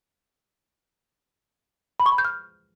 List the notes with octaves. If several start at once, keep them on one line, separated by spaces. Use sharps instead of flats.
B5
C#6
B5
G6
F6